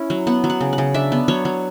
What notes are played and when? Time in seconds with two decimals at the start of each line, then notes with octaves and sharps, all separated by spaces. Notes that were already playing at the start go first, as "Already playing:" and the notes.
Already playing: C#4 E4
0.10 F#3
0.27 B3 F#5
0.44 F#3
0.50 F#5
0.61 C#3
0.73 F#5
0.78 C#3
0.94 D4 E5
1.12 B3
1.28 F#3 C#5
1.45 F#3